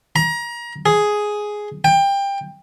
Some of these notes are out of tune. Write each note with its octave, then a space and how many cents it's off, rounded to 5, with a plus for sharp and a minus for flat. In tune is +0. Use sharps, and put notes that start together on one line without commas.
A#5 +30
G#4 +5
G5 +20